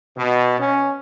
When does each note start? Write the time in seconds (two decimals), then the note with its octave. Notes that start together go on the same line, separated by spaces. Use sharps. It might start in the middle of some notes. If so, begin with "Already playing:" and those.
0.17 B2
0.59 C#4